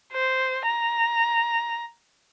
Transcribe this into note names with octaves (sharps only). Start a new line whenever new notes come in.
C5
A#5